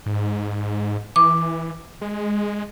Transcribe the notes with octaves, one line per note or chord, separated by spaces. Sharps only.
G#2
E3 D6
G#3